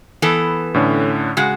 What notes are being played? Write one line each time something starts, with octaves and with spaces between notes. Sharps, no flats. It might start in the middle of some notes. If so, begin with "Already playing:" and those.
E3 B3 A4
A2 D3 C#4
C#3 G#3 F#4